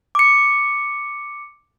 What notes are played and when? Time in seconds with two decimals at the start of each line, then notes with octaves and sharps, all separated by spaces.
0.15 D6 C#7